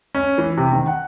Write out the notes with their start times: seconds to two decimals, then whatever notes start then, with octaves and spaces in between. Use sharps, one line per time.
0.15 C#4
0.38 E3
0.57 C3
0.72 D#3
0.87 F#5